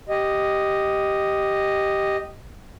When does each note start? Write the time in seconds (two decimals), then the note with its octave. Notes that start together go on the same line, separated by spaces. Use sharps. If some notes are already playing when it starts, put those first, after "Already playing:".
0.09 G4 D#5